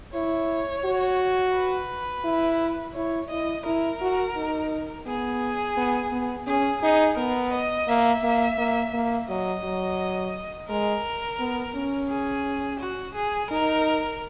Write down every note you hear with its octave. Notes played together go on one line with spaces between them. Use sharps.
E4 C#5
F#4
B4
E4
E4 C#5
E4 D#5
E4 A#4
F#4
D#4
B3 G#4
B3
B3
C#4 G#4
D#4 G#4
B3 A#4
D#5
A#3 E5
A#3
A#3
A#3
F#3 D#5
F#3
G#3 A#4
B3
C#4
G#4
F#4
G#4
D#4 A#4